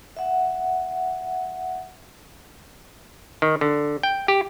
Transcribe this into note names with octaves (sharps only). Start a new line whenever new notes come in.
E5 F#5
D#3
D3
G5
G4